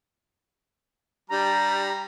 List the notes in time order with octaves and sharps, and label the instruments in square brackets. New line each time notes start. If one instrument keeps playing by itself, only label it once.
[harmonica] G3 [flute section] D4 G4 A#5